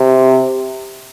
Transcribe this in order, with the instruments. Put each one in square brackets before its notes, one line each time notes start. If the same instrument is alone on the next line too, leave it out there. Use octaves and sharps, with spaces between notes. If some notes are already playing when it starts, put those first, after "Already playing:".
Already playing: [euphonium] C3